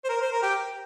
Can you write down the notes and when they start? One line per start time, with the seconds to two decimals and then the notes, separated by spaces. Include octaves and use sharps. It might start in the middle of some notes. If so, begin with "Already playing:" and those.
0.05 C5
0.09 A#4
0.21 C5
0.32 A#4
0.43 G4